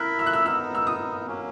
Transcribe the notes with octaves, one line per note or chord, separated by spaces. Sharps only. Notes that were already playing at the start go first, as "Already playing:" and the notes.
Already playing: E4 A#4 E5 F#6
E6
F#6
E6
B3 D#4 A#4 E6
E6
D#6
F#3 A#3 C#4